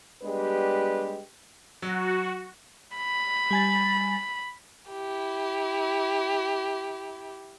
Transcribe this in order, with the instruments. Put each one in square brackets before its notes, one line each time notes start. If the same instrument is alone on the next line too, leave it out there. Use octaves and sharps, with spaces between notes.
[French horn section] G3 G#3 B3 D4 G4 B4
[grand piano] F#3 [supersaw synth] F#4
[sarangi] B5
[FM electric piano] G3 G#5 A6
[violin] E4 G4